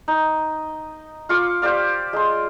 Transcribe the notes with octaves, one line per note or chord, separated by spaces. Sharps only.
D#4
F4 F5 C#6 D6
G4 C5 D5 F5
G#3 C6